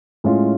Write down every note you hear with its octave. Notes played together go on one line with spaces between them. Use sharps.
A2 G#3 C#4 F4